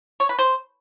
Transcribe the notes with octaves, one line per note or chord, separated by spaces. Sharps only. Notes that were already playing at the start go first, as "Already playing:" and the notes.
C#5
B4
C5